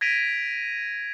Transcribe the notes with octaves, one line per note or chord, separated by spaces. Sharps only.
G#6 A#6 B6 D7 D#7 F7